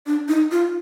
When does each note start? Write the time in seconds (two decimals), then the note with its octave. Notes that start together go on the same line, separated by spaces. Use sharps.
0.06 D4
0.28 D#4
0.51 F4